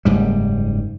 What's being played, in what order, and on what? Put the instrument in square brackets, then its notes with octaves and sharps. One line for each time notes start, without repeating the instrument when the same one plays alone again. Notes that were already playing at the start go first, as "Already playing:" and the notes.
[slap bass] F#1 G#2 G3